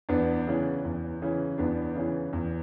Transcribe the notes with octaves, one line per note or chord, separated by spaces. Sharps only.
E2 B3 D4
C#3 E3
E2
C#3 E3
E2 B3 D4
C#3 E3
E2